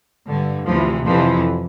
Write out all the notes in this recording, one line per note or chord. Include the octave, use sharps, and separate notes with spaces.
G2 D3
D2 C3 E3 F3
F2 C3 E3 F3